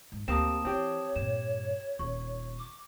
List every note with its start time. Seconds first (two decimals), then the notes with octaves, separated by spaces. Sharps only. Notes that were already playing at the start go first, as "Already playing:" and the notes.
0.12 G#2
0.28 D2 A#3 C4 G4 A5 D#6 E7
0.65 E3 C4 G4 C#5
1.16 G2 A#2 E7
1.99 D#1 F4 C#6
2.59 D6